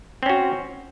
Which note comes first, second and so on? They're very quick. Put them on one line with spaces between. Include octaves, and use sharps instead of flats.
C4 C#4 F#4